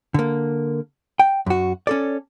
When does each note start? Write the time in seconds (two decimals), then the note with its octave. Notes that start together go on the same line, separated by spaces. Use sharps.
0.14 D3 A#3
1.19 G5
1.46 F#2 F#4
1.87 C#4 A4 D5